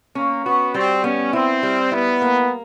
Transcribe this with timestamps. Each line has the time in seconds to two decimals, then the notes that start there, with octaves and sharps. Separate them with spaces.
0.15 A#3 C#4
0.45 B3 F#4
0.74 G3 C4
1.04 B3 C#4
1.33 C4 E4
1.63 G3
1.91 B3 E4
2.22 A#3